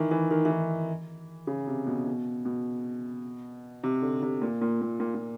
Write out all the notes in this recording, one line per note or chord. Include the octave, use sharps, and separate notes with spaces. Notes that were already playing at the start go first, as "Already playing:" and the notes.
Already playing: D#3 E3
E3
D#3
E3
D#3
C#3
C3
B2
B2
B2
C3
D3
C3
A#2
A#2
A#2
A#2
A#2